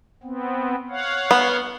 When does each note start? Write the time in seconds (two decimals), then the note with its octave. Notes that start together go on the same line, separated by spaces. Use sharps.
0.23 B3 C4
0.90 C#5 F5 F#5
1.31 B3